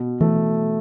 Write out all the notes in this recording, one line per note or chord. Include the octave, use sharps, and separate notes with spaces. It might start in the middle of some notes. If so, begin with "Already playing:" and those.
Already playing: B2
E3 A3